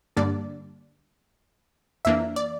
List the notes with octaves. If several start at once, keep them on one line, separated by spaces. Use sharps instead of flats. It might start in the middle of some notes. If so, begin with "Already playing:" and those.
G2 D3 G3 A#3 D4 D5
F2 E3 A#3 D4 E5
D5